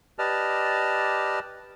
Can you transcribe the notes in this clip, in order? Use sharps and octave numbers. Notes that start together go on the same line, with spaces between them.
G4 B4 D5 D#5 A5 F6